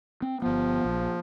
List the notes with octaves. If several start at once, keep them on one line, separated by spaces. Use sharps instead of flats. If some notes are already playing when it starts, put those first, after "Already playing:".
C4
G1 F3 B3
A#1